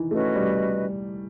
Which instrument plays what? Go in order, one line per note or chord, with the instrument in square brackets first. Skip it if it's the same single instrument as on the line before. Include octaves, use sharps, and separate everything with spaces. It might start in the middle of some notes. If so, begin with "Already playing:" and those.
Already playing: [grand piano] D#3 E3
[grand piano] A3 [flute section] C#4 F#4 B4 D#5
[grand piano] G3